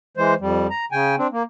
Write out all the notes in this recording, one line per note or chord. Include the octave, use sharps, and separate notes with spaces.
E3 G#3 C5
F2 G3
A#5
C#3 G5 G#5
C4 D4
A#3